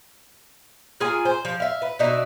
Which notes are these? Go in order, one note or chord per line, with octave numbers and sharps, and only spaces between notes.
F4 G#4 A#4 G#5
C5
F3
E5 F5
B4
B2 D4 D#4 E5